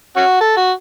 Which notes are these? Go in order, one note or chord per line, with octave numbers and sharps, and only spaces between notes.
C#4 F#4
A4
F#4